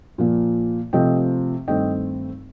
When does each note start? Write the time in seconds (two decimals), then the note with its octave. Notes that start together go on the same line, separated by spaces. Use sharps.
0.18 A#2 F3 A#3
0.93 C3 F3 A3 C4 D#5 G5
1.67 G2 D#3 A3 C4 D#5 G5